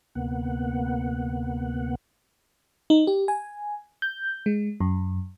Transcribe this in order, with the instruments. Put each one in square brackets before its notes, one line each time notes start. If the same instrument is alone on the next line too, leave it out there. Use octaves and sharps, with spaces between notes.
[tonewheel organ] D2 C3 A#3 B3 F#5
[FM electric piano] D#4
G4
G#5
G6
G#3
F#2